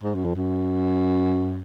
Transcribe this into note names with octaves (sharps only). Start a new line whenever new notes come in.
G#2
F#2
F2
F#2